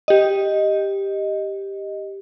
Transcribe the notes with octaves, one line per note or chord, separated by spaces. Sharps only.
G4 D#5